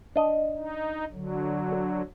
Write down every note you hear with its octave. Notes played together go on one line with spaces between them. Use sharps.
D4 D#5
D#4
D3 F#3